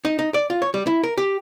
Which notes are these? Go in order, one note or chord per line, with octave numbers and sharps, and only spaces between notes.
D#4
D#4
D5
F4
C#5
G3
E4
A#4
G4